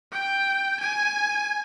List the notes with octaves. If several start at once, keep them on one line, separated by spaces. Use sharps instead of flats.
G5
G#5